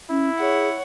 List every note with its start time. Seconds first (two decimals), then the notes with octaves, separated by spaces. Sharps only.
0.10 C#4 E4
0.39 G#4 C#5 F#5